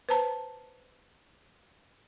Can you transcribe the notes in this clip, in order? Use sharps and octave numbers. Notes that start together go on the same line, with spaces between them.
B4 C5 A5 A#5